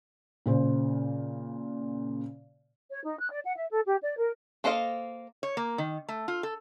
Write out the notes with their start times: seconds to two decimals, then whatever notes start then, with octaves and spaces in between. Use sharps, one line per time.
0.46 A#2 C#3 C5
2.91 C#5
3.03 D#4
3.19 F#6
3.30 D5
3.44 F#5
3.57 E5
3.70 A4
3.85 G4
4.03 D5
4.17 A#4
4.64 A#3 A4 C5 D#5 F5
5.43 C#5
5.57 A#3
5.78 D#3
6.08 A3
6.28 F4
6.43 A4